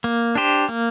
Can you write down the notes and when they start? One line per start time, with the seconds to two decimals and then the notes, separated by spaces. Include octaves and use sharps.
0.04 A#3
0.35 D4 G4 C5
0.69 A#3